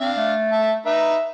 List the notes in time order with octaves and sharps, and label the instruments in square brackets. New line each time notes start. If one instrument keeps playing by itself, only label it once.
[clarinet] C4 [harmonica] D4 F5
[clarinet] A3
[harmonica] E5 A5
[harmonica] D#4 B4 [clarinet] E5